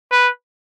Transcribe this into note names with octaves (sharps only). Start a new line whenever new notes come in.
B4